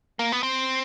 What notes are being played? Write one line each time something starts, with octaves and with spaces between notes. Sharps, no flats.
A#3
B3
C4